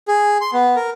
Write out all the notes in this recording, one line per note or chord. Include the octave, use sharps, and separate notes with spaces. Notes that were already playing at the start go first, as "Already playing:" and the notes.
G#4
C6
B3
A#4